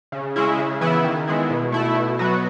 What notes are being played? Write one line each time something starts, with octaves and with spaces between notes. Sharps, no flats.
C#3
G#3 C#4 E4
C#3
E3 B3 E4
D#3
G#3 B3 E4
B2
A3 E4
B2
F#3 B3 F#4